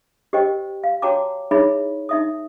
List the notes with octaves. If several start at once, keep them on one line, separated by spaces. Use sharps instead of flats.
G4 A#4 C5 D#5 G5
F5
F#4 C#5 G5 A5 A#5 D6
D#4 E4 G#4 C#5 E5 B5
D#4 E5 D#6